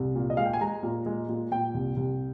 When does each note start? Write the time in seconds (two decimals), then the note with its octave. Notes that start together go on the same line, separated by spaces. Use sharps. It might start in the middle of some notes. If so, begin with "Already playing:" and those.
Already playing: C2
0.15 A#2
0.30 D#5
0.37 G#3 F5
0.45 G5
0.53 G#5
0.61 G#3 A#5
0.83 A#2
1.06 G#3
1.29 A#2
1.51 A#2 G5
1.74 C2
1.97 C2